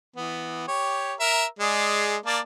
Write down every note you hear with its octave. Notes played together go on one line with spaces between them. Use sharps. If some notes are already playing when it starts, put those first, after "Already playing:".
E3 B3
G4 C#5
A#4 E5
G#3 G#4 D5
A#3 D5 A5